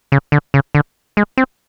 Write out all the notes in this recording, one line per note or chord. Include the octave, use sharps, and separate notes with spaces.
C#3
D3
C#3
D3
G#3
C4